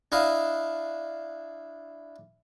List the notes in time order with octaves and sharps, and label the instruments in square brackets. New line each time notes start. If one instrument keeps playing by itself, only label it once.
[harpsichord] D4 E4 D#5 F5